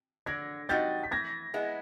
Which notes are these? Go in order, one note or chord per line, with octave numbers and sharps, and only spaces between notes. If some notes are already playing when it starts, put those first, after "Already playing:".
D3 G#6 A#6
G3 C4 D#4 F#4 G6 A6
B6
E3 G#6 A#6
G#3 B3 E4